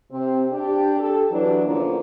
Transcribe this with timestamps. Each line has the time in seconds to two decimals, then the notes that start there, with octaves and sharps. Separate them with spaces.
0.12 C3 C4
0.52 D4 G4
0.99 G4 A4
1.30 E3 F#3 D4
1.66 E2 D3 F3 A#3 C#4